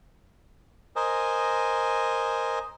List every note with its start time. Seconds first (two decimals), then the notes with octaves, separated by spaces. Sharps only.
0.96 A#4 C5 D#5 G#5